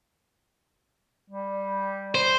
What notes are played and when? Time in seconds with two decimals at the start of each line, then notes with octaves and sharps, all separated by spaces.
1.30 G3
2.15 C5